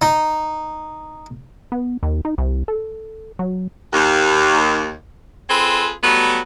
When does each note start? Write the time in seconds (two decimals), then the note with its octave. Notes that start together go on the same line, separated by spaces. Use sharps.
0.02 D#4
1.72 B3
2.03 D#2
2.25 D#4
2.38 C2
2.68 A4
3.39 F#3
3.93 D#2
5.50 C4 F4 G#4 A4 B4
6.04 F#3 G3 A3 B3